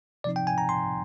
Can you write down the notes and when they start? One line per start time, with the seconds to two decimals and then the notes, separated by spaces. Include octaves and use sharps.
0.24 C3 F3 C4 D#4 D5
0.36 G5
0.47 G#5
0.58 A#5
0.69 C6